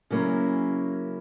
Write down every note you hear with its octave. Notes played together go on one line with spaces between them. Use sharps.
C#3 F#3 A#3 C#4 E4